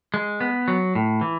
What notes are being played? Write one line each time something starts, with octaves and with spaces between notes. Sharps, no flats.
G#3
B3
F#3
A2
E3